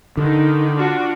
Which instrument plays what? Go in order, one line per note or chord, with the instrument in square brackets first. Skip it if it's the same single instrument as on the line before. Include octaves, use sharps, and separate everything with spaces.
[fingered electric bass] D3 [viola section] D#3 D#4
[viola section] D4 F4 F#4